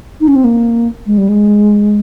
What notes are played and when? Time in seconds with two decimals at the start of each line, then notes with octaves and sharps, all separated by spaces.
0.21 D#4
0.28 C#4
0.36 C4
0.44 A#3
1.07 G#3
1.18 G3
1.29 G#3